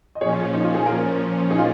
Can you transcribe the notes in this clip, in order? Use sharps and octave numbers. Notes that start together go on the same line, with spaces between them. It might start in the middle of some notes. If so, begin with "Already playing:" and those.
D#5
A#2 F3 C#4 G#4 C#5
D#4
F4
G#4
F4 A#4
D#4 G#4
F4